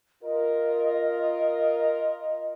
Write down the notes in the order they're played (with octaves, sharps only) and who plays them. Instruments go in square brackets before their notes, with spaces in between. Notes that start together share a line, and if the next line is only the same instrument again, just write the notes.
[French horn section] F4 A#4 [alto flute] D#5